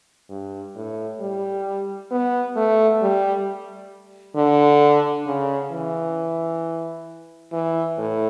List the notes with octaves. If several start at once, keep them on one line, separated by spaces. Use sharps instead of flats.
G2
A2
G3
B3
A3
G3
D3
C#3
E3
E3
A2